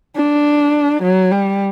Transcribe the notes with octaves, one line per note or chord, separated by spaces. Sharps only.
D4
F#3
G3